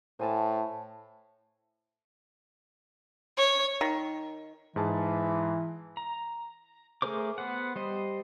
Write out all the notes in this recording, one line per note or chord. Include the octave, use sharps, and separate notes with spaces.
A2 C5 G#5 A5
C#5
D#3
G#2 E3 G#4 A5
A#5
A3 G#4 A#4 C5 D6
B3 C5 F#5
G3 C5 D#5